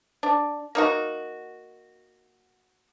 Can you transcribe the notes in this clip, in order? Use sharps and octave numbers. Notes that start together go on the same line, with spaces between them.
D4
A#3 D#4 F#4